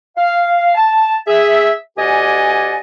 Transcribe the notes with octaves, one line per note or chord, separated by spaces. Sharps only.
F5
A5
G#4 E5
D2 G4 D5 D#5 F#5 G#5